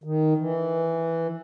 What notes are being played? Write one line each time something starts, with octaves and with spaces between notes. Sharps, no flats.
D#3
E3